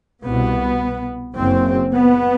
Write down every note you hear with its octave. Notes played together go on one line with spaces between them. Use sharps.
C2 B2 B3
F#1 F#2 C4
B3